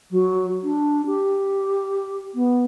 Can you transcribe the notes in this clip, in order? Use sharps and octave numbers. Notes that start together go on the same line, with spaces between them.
F#3
D4
G4
B3